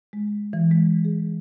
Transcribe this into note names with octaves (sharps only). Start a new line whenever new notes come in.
G#3
E3
G#3
G#4